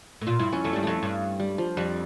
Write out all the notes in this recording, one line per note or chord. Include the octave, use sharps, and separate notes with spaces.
A2
A#2 F4
G2 E4
F2 C#4
F2 A3
G2 G3
F2 A3
G2
G3
F3
F2 G3